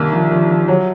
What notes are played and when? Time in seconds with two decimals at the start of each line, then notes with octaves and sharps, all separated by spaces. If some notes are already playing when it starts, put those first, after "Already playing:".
Already playing: C2 D#3 A#3
0.13 F3
0.31 F3
0.50 F3
0.68 F#3